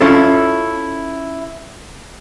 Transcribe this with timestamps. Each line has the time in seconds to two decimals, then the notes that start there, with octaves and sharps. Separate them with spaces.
0.01 C#4 E4 F4 A4